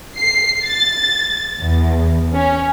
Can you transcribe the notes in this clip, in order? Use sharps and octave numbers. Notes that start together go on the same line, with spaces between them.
C7
A6
E2
C#4